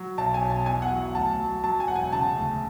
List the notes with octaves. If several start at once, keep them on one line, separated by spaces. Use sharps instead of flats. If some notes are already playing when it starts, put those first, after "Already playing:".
Already playing: F#3
B1 A5
G#5
B1
A5
E2 G#5
F#5
F#3
D2 A5
F#3
F#3 A5
G#5
E1 F#5
G#5
C#3 A5
D2